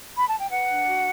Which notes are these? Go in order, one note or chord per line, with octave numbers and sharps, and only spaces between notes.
B5
A5
G5
B4 F#5
D4
F#4